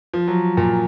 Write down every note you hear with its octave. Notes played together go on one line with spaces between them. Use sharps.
F3
F#3
A#2